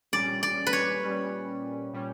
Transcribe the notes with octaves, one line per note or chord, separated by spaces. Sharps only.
A#2 G3 C#4 D5
D5
B4
C#5
A#2 G3 C#4
A#2 G3 C#4